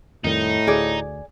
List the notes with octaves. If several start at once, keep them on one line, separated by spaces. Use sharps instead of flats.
F2 A2 D#3 G3 D#4
D2 G#4 D5